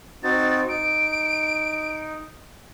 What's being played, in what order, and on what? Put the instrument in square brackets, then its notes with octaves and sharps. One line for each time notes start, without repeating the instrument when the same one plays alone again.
[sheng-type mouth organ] C4 D#4 F#4 [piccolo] A6
[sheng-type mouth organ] D#4 [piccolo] D7